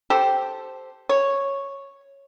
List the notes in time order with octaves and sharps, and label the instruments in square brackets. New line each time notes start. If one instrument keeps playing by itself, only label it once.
[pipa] G4 A4 C5
C#5